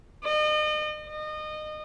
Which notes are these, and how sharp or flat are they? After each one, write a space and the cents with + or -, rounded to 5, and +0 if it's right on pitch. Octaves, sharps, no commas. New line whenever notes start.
D#5 -40
D#5 -25